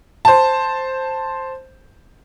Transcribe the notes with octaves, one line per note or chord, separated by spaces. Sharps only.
C5 A5